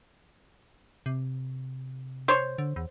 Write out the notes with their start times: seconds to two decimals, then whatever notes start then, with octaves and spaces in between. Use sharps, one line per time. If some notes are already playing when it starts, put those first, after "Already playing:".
1.06 C3
2.28 C5 C#5
2.58 D3
2.76 E2